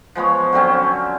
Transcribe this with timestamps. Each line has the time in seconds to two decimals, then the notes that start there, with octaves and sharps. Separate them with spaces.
0.15 F3 G#3 B3 C#5
0.53 D3 F#3 C4 C#4